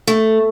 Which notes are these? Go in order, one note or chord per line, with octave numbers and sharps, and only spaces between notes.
A3